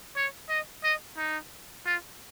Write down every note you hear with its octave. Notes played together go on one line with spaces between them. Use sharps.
C#5
D#5
D#5
D#4
F4